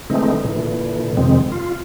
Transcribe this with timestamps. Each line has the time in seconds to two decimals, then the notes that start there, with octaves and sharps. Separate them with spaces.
0.10 D3 E3 G#3 A3 C4 D#4
0.45 A#2 D3 E3
1.17 F2 C3 D#3 G#3 C4
1.52 F4